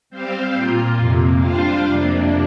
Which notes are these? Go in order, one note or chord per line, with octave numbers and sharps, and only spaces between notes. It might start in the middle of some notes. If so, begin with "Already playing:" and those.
G3 C4 G4 C5 F5
A#2 A#3 F4
F2 C3 A#3
G3 D4 F4 C5 F5
F2 C3 A#3 D4